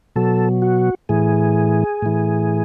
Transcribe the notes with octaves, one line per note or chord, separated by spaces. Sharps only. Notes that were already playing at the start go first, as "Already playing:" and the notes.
B2 F#3 A4
F#4
A2 E3 G#4
A2 E3